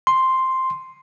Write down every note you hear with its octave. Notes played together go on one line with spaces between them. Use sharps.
C6